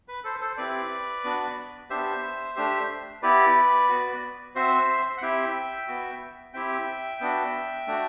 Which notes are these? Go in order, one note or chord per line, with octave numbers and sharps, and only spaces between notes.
B4
A4 C5
A4 C5
C4 E4 G4 B4 D5
B3 D4 F#4
B3 D4 G4 C5 E5
A3 D4 G4
B3 E4 G4 B4 D5
B3 F#4
C4 F#4 C5 E5
F#5
C4 E4 G4 E5 G5
B3 F#4
C4 E4 G4 E5 G5
B3 D4 F#4
A3 D4 F#4